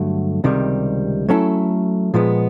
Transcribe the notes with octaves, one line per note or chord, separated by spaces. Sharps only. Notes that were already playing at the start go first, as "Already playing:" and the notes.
Already playing: G2 D3 F#3 A3
C#2 C3 D#3 G3
F#3 A3 C#4 E4 A4
A#2 F3 G#3 B3